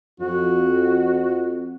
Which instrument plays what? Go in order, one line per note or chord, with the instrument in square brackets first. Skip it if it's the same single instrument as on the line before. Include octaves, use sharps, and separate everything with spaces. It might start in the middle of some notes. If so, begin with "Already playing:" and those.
[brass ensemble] F2 [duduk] F#4